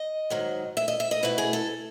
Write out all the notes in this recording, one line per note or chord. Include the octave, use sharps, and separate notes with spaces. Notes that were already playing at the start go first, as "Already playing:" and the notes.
Already playing: D#5
G#2 D#3 F#3
E5
D#5
E5
D#5
B2 A3 E4 B4
G#4
A4